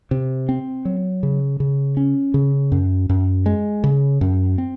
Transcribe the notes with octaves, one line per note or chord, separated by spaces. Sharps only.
C3
C4
F#3
C#3
C#3
C#4
C#3
F#2
F#2
G#3
C#3
F#2
C4